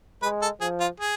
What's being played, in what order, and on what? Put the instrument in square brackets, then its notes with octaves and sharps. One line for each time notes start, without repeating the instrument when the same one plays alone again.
[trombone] G#3 [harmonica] B4
[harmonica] A4
[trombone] F3 [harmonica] G#4
[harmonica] F4
G#4